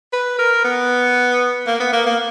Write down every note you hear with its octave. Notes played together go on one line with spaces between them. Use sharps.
B4
A#4
B3
A#3
B3
A#3
A#3